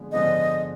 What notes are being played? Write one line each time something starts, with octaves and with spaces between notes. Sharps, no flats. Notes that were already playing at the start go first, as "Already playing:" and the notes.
Already playing: D3 F3 G#3 B3
D3 F3 G#3 B3 D4 D#5